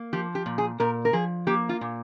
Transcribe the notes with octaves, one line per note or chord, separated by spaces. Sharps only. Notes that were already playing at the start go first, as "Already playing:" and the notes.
Already playing: A#3
F3 G4
G4
A#2
G#4
A#2 A#4
A#4
F3 G#4
A#3 G4
F4
A#2